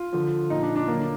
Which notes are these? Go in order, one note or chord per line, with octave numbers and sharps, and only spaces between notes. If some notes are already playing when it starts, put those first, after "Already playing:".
Already playing: F4
D3 F3
A#2 F3 D#4
D4
D4
D3 F#3 A#3